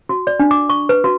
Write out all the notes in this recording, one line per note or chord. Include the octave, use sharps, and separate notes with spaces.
F#4
D5
D4
D6
C#6
B4
F#4